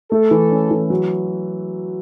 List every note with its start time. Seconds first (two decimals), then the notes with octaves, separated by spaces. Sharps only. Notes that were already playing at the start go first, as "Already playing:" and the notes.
0.11 A3 A4
0.31 E3
0.51 C#4
0.71 E3
0.90 F#3